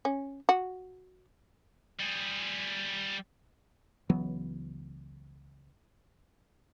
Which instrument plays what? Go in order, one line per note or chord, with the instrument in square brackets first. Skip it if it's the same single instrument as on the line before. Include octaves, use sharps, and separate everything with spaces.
[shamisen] C#4
F#4
[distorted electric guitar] G3 G#4
[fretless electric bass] C#2 E3 F#3 B3